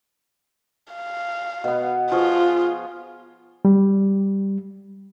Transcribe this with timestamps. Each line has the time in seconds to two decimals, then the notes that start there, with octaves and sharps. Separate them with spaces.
0.93 F5
1.64 B2 B3
2.12 F3 F4 G#4 C#6
3.65 G3